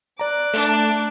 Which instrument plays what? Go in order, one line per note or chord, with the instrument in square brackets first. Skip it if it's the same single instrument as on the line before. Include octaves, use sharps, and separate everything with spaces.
[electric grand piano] D5 A#5 [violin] D6 F#6
[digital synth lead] A3 [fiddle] D4